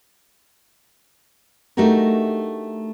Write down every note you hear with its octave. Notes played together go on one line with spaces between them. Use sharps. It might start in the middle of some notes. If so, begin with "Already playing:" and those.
A3 D4 D#4 F#4 G4 A#4